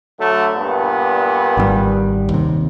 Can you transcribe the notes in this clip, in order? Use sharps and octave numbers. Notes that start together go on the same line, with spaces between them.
D3 F#3 A3
G2 A#2 B3
G#1 D3 G3
D#2 C3